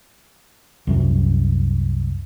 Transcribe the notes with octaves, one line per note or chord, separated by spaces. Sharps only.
C2 F#2